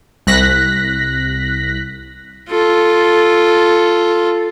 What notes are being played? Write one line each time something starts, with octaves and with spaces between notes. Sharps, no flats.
C2 F#6 A#6 B6
F4 A4